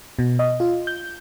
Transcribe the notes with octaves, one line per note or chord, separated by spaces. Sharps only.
B2
D#5
F4
G6